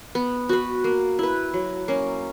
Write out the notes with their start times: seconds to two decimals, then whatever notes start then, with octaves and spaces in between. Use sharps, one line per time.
0.15 B3
0.49 F#4 B4
0.84 A#3
1.19 E4 B4
1.54 F#3
1.88 A#3 C#4